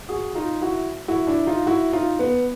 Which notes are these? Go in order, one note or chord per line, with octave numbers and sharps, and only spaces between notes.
F#4 G#4
D#4 F4
E4 F#4
E4 F#4
D4 E4
D#4 F4
E4 F#4
D#4 F4
B3